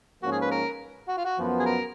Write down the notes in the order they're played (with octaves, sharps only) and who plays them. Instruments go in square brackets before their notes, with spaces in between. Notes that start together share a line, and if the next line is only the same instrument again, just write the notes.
[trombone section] G#2 F3 A#3 C#4 [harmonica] F#4
[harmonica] G#4
B4
A#4
F#4
F4
F#4
[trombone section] F#2 F3 B3
[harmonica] G#4
A#4